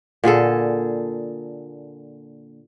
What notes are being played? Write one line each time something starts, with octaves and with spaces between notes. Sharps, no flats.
A#2 D3 G#4 A4